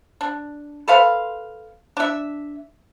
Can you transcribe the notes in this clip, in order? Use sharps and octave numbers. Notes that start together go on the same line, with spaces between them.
D4
A4 B4 C5 F5
D4 E5